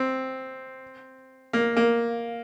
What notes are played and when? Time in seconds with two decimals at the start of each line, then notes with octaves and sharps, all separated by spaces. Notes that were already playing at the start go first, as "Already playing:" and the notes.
Already playing: C4
1.53 A#3
1.77 A#3